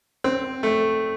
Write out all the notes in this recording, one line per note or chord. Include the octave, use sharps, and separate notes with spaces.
C4
A3